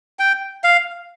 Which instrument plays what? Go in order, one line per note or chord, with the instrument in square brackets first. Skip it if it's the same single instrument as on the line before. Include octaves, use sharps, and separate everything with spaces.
[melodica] G5
F5